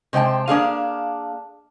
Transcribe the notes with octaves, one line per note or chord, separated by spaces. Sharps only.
C3 G#3 C5 G5 A5
A#3 D4 G#4 F5